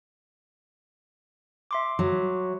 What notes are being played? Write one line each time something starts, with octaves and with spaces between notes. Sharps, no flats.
E5 C6 D6
F#3